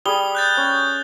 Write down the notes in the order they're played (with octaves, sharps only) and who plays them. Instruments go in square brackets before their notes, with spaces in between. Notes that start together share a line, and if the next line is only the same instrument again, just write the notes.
[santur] G3 G#4 [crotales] D#6 G7
[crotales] F#6 G6 A6
[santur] C#4